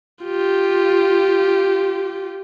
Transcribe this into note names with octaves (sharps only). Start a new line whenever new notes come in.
F4 G4